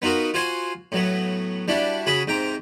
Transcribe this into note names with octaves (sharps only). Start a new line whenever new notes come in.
B3 D#4 F4 F#4 A#4
F4 F#4 C5 G#5 C6
A2 F#3 B3
G3 D4 E4 F#4
C#3 F#4 G#4 B5 D#6
G#2 C3 G5 A#5